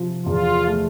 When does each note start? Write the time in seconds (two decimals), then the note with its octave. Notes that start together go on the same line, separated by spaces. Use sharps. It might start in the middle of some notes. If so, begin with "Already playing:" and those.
Already playing: C3 F3
0.26 E2 F4
0.67 A3